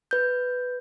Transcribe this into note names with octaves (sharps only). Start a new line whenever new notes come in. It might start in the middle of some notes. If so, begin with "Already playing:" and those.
B4 G6